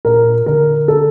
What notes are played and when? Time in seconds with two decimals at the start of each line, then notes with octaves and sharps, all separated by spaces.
0.05 A#2 A#4
0.46 D3 A#4
0.88 A4